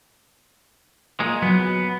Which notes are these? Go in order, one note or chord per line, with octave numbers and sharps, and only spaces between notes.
A#2 G#3
F#3 B3